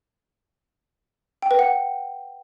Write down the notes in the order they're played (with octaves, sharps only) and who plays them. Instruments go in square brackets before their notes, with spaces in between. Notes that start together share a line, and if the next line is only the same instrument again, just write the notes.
[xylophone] G5
B4
F#5